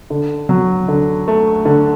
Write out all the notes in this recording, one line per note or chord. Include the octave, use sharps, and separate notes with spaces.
D3
F#3
D3
A3
D3